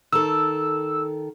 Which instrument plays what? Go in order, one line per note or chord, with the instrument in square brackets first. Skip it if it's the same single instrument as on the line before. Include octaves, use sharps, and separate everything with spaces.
[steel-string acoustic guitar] D#3 A4 [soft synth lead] E6